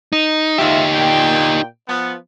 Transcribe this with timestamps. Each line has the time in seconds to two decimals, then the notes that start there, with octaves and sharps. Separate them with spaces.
0.13 D#4
0.58 G#2 D#4 F4 G4 E5
0.93 A#2 G5
1.88 F3 B3